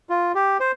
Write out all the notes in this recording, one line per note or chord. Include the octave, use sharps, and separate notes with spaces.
F4
G4
C5